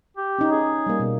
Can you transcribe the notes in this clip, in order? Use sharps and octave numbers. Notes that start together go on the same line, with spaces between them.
G4
C#4 D#4
G#4
G3 A#3
B2